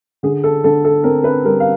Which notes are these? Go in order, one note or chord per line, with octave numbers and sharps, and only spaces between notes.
D3 G#4
A4
D3 A4
A4
C4 A#4
B4
G3 A#4
F5